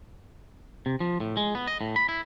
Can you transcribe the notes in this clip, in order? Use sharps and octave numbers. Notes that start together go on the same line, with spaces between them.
C3
F3
A2
G#3
B3
D#5
A2
B5
E4